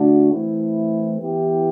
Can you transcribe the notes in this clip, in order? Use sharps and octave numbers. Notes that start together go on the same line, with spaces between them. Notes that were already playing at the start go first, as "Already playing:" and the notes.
Already playing: D3 A3 D4 F#4
E3 A3 C4 E4
E3 B3 E4 G4